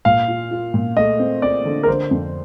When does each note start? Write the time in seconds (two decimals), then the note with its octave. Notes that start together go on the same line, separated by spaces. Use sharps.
0.05 A#2 F5
0.28 F4
0.51 F4
0.74 A#2
0.97 A3 D#5
1.19 C4
1.42 C4 D5
1.65 D3
1.83 A#4
1.88 D3 C5
2.11 F2